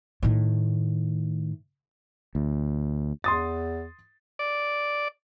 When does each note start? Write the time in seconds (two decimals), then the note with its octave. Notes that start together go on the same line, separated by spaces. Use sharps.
0.22 A2 D#3
2.35 D2
3.24 E2 C6 D#6 A6
4.39 D5